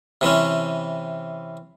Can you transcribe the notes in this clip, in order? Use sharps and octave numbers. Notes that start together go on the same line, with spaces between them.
C3 E3 C4 C#4